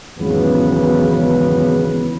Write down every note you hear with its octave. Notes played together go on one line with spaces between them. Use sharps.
G#1 E2 C#3 F#3 B3 B4